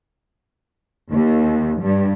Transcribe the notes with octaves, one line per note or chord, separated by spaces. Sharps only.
D#2
G2